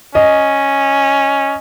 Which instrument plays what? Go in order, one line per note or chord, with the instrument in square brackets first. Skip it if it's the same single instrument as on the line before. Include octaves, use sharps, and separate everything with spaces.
[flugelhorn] C#4 [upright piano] D#5